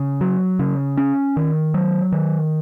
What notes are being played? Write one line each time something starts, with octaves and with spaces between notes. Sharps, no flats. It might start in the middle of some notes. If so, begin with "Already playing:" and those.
Already playing: C#3
F#3
C#3
C#4
D#3
F#3
D#3